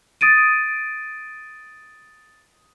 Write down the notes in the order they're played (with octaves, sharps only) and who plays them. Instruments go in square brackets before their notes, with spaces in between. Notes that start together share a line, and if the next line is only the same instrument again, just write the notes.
[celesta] D#6 A6 D7 D#7